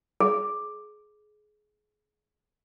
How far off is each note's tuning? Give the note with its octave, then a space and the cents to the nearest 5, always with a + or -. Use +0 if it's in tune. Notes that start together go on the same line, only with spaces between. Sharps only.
G#4 +25